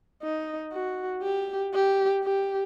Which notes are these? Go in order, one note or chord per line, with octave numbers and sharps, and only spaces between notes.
D#4
F#4
G4
G4
G4